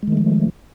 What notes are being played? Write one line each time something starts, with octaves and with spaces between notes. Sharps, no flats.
D#3 F3 G#3 A3